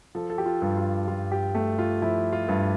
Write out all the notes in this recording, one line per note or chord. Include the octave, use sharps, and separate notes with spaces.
F3 A4
A4
G4
F4
G2
F4
G2 F4
G4
A3
F4
F3 E4
F4
G2